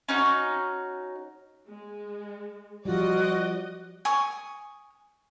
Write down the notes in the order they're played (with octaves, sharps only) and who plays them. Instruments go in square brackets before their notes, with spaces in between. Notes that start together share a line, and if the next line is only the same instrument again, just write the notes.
[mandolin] C#4 D#4 F#4
[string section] G#3
[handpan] F3 G3 [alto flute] F4 [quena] F#4 [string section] D5 D#5
[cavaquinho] G#5 C#6 D#6